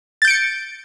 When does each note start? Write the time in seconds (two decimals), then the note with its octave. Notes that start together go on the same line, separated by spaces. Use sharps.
0.22 A6
0.25 G6
0.28 D7
0.31 C#7